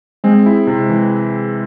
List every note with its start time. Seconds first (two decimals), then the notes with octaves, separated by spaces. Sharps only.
0.24 G#3 C4 G#4
0.46 E4
0.67 C3
0.89 E3